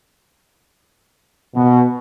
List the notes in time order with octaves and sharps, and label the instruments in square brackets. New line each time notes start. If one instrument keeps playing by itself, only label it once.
[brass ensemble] B2